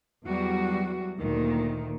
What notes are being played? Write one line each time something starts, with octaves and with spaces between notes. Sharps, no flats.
E2 F#3 G3 F#4
D2 A#2 D#3